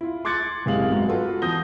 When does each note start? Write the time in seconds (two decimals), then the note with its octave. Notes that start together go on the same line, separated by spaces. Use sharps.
0.01 E4 F4
0.25 C6 D6 F#6 G#6 A6 C#7
0.66 F#1 C3 G#3 G#4 F5 F#7
0.90 G#2 F#3 G#3 B3
1.08 F4 F#4 A4 B4
1.42 E3 F3 D#6 G6 A#6 G7